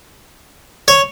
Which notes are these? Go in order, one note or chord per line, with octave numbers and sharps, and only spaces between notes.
C#5